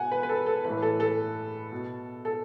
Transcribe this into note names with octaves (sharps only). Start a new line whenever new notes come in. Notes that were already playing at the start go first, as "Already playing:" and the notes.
Already playing: B2 F#5 G#5
B4
B4
A4
A4
A2 E3 B4
A4
A4
B2
A4